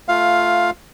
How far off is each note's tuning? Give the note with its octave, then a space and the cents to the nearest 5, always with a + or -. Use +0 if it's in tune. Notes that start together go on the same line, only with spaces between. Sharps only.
A3 +0 F4 +0 F5 +10